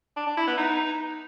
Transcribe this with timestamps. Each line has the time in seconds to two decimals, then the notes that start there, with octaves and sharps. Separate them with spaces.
0.16 D4
0.27 D4
0.37 E4
0.47 B3
0.58 D#4